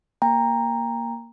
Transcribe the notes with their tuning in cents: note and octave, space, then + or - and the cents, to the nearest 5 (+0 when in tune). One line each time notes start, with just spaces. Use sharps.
A#3 +0 G5 +30 A#5 +0